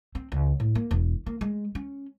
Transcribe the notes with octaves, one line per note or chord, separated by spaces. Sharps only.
C4
C#2
A2
A#3
E1
A#3
G#3
C#4